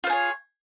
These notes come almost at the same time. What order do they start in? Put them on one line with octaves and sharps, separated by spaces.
F4 C5 G#4 C#5